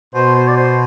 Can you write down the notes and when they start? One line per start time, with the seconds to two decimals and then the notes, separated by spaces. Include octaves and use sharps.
0.15 B2 C5
0.35 C5
0.48 D5
0.56 C5